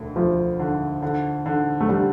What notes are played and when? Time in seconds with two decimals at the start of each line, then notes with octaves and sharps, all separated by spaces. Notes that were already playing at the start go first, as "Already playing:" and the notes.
Already playing: E1 D2
0.16 D2 F3
0.59 D3
1.02 D3
1.46 D3
1.81 A3
1.88 D3 G3